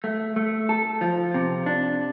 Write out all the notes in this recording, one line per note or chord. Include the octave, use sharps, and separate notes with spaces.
A3
A3
A4
F3
C3
D4